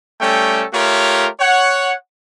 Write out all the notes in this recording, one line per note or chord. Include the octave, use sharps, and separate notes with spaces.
G3 A3 C#4 A4 G5
A3 F4 G4 A#4 C#5
C#5 F#5